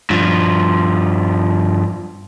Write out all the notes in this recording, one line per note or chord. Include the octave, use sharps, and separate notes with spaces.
G2 F3